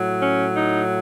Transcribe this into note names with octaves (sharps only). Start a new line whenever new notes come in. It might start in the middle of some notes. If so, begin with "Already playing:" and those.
Already playing: A2 F#3
C#4
D#4